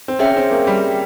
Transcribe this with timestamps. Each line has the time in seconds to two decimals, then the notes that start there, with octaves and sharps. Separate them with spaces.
0.08 C4
0.19 C#4 G#4 E5 G5
0.36 C4
0.51 A#3
0.67 G3